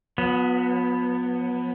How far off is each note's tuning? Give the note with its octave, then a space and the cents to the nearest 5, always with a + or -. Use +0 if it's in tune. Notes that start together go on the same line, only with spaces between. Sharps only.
F#3 -45 B3 +0